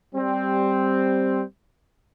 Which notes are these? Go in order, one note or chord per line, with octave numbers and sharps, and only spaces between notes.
G3 C4